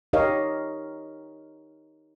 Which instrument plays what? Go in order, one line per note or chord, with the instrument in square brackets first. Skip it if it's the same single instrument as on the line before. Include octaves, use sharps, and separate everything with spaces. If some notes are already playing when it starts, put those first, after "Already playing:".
[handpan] D#4 G4 A#4 C#5 D#5 F5